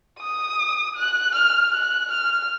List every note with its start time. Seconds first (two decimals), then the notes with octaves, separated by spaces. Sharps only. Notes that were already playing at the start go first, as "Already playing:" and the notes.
0.19 D#6
0.96 F#6
1.35 F6
1.73 F#6
2.11 F6